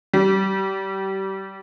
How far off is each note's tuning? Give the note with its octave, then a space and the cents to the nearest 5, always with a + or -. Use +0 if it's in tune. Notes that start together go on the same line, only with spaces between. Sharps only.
G3 -30